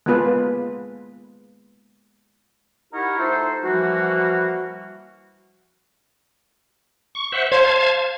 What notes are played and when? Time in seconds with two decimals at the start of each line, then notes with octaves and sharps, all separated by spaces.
0.06 G#3 A#3 B3 F4 B4
2.93 D#4 E4 G4 A#4 C#5 F#5
3.19 A3 D#4 F4 A4 C5
3.63 E3 F3 G3 A#3 F#4
7.15 C#6
7.32 C5 E5 F#5
7.52 C5 F5 A5 G#6